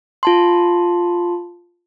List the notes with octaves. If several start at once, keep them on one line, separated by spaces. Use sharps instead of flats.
F4 A5 C6